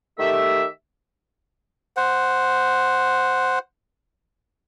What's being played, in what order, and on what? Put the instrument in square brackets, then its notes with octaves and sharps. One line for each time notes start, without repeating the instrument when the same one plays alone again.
[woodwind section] D#3 A3 G4 E5
[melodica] C5 F#5